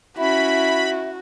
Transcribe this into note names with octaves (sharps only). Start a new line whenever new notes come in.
C#4 E4 F#4 E5 B5